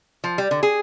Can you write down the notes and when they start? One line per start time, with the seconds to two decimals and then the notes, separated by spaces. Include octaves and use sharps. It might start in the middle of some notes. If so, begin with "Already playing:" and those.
0.24 F3
0.38 G3
0.51 D3
0.63 G#4